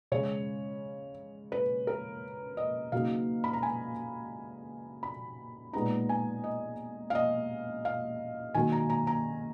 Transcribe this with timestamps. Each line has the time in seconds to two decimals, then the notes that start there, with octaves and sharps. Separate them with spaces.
0.12 C#3 G#3 C#4 C#5
1.52 B4
1.87 A#4
2.57 D#5
2.92 C#3 F#3 A#3 D#4 F5
3.44 B5
3.53 A#5
3.63 G#5
5.03 B5
5.73 A#2 G#3 B3 D#4 A#5
6.09 G#5
6.44 D#5
7.10 F5
7.15 D#5
7.85 F5
8.55 D#3 F#3 A#3 G#5
8.72 A#5
8.90 A#5
9.07 A#5